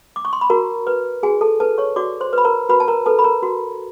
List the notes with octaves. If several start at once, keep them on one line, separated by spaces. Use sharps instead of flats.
D6
C#6
C6
B5
F#4 A#4 A#5
B4
F#4 G#4 G#5
A4 A5
A4 B4 A5
C#5 C#6
F#4 D5 D6
C5 C6
B4 B5
A#4 A#5
F#4 B4 B5
A5
A#4 A#5
A4 B4 A5
B5
A#4 A#5
F#4